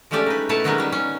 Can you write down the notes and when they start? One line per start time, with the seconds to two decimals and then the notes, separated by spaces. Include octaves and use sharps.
0.11 F3 G#3 A3 C#4 G4 D5
0.26 D#4 B4
0.49 B2 A3 E4 B4 C#5 A5
0.64 D#3 F#3 G#3 B3 C#4 D#4
0.78 G3 C#4
0.92 C#4